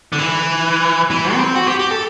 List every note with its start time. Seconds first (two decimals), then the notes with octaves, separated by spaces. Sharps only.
0.13 D3
0.19 E3
1.11 E3
1.34 C4
1.55 F#4
1.67 G4
1.79 G4
1.91 A4